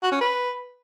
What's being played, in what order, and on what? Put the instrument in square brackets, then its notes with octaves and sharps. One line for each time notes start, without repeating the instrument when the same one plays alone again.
[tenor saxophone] F#4
C#4
B4